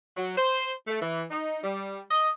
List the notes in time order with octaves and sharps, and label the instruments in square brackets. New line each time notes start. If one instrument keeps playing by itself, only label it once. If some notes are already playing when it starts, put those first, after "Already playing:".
[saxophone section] F#3
C5
A3
E3
D#4
G3
D#5